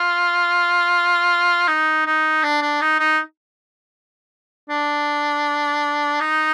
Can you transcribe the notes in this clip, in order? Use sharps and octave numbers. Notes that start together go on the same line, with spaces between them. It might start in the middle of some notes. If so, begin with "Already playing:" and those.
Already playing: F4
D#4
D#4
D4
D4
D#4
D#4
D4
D#4